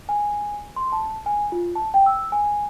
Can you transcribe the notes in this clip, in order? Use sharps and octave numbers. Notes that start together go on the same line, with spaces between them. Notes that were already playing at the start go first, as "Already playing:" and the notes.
G#5
C6
A5
G#5
F4
A5
G5
E6
G#5